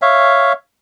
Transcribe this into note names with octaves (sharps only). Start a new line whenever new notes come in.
C#5 E5 F5